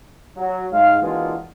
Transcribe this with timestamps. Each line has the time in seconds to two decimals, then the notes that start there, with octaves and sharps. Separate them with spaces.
0.36 F#3
0.72 G#2 F5
1.02 E3 G#3 A#3 D4 F4 F#4